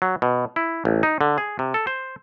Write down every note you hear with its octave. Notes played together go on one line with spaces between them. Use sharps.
F#3
B2
E4
A1
D#4
D3
G#4
C3
A4
C5